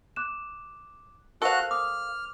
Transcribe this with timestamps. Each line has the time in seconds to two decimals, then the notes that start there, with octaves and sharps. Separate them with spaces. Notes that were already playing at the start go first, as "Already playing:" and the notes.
0.16 D6 F#6 E7
1.42 F#4 A4 A#4 C5 F5 F#6
1.71 D6 D#6 F6